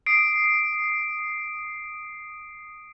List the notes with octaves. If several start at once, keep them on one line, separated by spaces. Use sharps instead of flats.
D#6 C7 D7